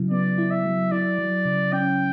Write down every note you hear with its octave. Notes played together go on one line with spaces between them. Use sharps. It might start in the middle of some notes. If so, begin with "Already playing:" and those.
Already playing: C#3 F#3 E4
B3 D5
E4
E5
F#3
E4 D5
F#3
C#3
C#4 G5